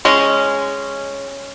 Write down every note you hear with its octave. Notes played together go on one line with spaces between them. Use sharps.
G#3 C#4